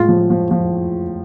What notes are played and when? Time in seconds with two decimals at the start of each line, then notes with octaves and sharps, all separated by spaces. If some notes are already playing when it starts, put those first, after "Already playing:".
Already playing: A2 G#3 F4
0.08 F3
0.30 F3
0.51 F3